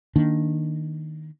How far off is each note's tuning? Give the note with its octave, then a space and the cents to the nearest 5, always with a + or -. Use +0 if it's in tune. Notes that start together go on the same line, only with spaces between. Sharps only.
D#3 +0 A#3 +0 D4 +0